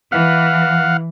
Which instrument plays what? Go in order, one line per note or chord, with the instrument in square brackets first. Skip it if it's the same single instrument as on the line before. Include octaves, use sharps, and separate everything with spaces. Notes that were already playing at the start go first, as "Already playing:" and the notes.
[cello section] E3 [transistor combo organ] F5 F#5